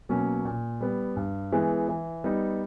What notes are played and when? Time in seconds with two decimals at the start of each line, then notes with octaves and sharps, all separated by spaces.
0.09 B2 F#3 A#3 C#4
0.45 A#2
0.81 G3 B3
1.16 G2
1.52 E3 G#3 B3
1.89 E3
2.24 G3 B3 D#4